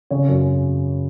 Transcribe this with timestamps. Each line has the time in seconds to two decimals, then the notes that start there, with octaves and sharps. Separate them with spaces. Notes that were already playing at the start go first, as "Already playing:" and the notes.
0.10 C#3 C#5
0.28 F#2